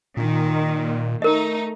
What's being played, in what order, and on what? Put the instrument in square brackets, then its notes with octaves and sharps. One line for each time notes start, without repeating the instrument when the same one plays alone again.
[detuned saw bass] A#2 [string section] D#3
[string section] A3 D#4 [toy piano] A#4 D#5